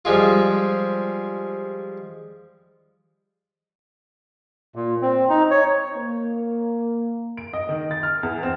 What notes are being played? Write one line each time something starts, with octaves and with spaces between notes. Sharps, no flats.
F3 G3 G#3 F4
A#2
C4
D#4
C#5
A#3
D7
D#5
D#3
A6
F6
E2
C4